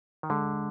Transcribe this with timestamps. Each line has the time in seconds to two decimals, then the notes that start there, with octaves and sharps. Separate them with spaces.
0.23 D#3
0.30 D3 G#3